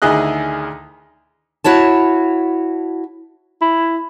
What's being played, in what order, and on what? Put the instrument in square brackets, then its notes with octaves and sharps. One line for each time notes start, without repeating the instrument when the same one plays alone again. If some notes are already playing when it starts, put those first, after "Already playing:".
[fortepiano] D2 D#3 E4 G#4 D#5 F#6
[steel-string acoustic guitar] E4 F#4 C#5 A5
[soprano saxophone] E4